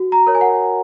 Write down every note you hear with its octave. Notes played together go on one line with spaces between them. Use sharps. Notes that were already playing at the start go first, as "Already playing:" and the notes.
Already playing: F#4
A#5
A#4 C#5
G#5
F#5